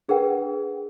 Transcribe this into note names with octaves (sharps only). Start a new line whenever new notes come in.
D4 G#4 A#4 B4 F#5 G5